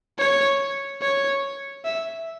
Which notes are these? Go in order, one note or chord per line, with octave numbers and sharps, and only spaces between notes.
C#5
C#5
E5